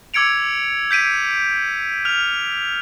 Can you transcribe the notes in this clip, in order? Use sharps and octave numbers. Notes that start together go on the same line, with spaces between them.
D6 E6 G#6 C#7 D7 F7
G6 B6 D7 D#7
F6 F7